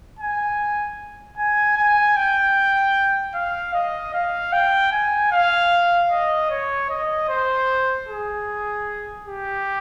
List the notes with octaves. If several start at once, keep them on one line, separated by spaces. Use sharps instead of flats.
G#5
G#5
G#5
G5
F5
D#5
F5
G5
G#5
F5
D#5
C#5
D#5
C5
G#4
G4